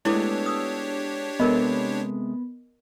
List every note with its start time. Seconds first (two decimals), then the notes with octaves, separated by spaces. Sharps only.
0.05 G#3 A3 B3 D4 E4 G4 C#5 D6
0.46 D#6 E6
1.40 C3 G#3 B3 A4 A#4 D#5